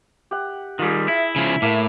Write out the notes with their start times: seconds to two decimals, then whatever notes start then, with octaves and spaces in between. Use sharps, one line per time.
0.31 G4 F#5
0.79 D#3 G3 F4 G#4
1.08 E4 E5
1.36 C#3 F3
1.62 A2 A#3 A#4 E5